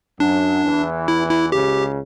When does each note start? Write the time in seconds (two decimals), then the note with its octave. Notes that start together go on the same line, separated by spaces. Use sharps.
0.19 F#2 F#3 D4
0.64 E2 E3
1.08 E4
1.30 E4
1.52 C#2 C#3 G4